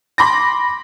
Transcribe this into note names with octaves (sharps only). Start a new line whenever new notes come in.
B5 C6 D6 A#6